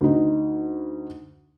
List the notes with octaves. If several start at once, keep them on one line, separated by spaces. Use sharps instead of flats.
D2 D#4